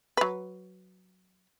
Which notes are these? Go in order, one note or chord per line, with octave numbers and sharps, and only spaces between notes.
F#3 B4